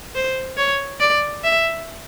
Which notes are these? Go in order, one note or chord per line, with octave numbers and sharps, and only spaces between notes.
C5
C#5
D5
E5